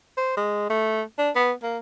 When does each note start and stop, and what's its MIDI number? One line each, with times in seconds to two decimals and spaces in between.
0.17 0.35 72
0.37 0.66 56
0.70 1.02 57
1.18 1.30 62
1.35 1.52 59
1.63 1.78 58